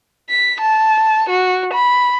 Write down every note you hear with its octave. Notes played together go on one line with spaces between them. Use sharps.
B6
A5
F#4
B5